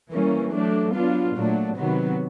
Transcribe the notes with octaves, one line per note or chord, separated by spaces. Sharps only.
E3 G3 A#3 C#4
F#3 A3 D4
F#3 B3 D4 F4
A#2 F#3 A3 D4
C3 D#3 F#3 B3